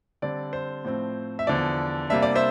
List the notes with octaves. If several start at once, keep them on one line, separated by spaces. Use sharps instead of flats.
D3 G3 C4 D5
C5
A2 F3 C4
E5
E2 D3 F3 D5
C3 G3 A#3 D4 E5
D5
C5 E5